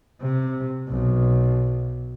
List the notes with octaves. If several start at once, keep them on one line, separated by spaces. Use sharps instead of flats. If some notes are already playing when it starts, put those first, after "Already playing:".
C3
B1